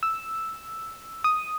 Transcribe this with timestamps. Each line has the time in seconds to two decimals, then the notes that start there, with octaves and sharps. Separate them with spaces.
0.03 E6
1.24 D#6